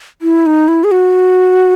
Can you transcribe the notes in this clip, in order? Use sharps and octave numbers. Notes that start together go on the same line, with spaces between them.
E4
D#4
E4
G#4
F#4